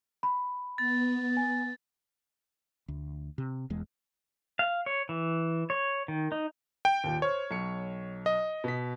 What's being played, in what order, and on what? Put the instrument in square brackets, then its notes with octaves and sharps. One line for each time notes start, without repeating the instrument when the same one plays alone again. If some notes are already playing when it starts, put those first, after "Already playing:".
[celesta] B5
[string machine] B3 [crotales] A6
[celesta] G#5
[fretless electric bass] D2
C3
E1 E2 G#3
[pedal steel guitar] F5
C#5
E3
C#5
D#3
D#4
[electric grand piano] G5
[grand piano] D#2 A#2
[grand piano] C5 F6 [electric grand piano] C#5
[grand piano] B1 C#7
[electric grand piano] D#5
[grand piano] B2 B6